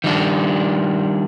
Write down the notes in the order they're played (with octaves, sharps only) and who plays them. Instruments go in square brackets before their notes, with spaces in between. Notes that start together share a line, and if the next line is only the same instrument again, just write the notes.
[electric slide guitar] D#3 G3 D4